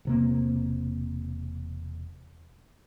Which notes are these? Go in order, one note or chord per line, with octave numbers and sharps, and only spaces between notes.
E1 C3 A#3